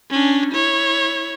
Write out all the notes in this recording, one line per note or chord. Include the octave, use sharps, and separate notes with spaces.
C#4 D4
E4 C#5